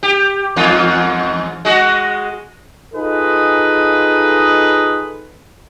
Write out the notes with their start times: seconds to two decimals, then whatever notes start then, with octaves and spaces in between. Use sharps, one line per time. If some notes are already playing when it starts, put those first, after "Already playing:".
0.03 G4
0.56 E2 G#2 F4
1.65 G#3 F#4
2.94 D#4 F4 G#4 A4 B4 D#5